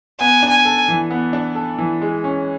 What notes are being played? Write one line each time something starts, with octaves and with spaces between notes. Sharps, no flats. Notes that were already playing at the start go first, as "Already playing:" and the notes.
B3 G#5
D4
G#5
A4
E3
B3
D4
A4
E3
G#3
C#4